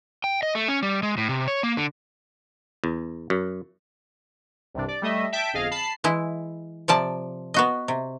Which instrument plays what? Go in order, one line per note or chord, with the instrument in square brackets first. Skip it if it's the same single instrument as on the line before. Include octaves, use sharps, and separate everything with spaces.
[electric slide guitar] G5
D#5
A3
C#4
G3
G#3
A2
C3
C#5
A#3
D3
[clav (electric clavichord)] E2
F#2
[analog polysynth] C2 G2 C3 D4
D5
G3 A3 D#5 E5
E5 G5 A5 G6 B6 D7
G1 F2 G#4 D#5 F5
A5 B5 C7
[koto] E3 G#3 E4
C3 F3 D5 A5
B3 F#4 D#5
C3